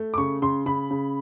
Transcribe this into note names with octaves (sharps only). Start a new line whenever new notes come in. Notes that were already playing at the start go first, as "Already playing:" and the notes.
Already playing: A3
D6
C#3 C#6
C#3 C6
C#3 B5
C#3